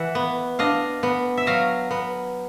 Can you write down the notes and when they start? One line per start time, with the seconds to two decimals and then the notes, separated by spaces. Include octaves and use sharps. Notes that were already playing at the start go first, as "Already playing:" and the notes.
Already playing: E3 E5 F#5
0.15 B3
0.59 D4 D#5 F5
1.03 B3
1.37 E5
1.47 F#3 D#5 F5
1.91 B3